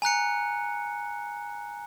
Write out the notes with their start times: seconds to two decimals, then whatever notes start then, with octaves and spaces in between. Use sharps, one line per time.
0.02 G#5 A#5 F#6 C#7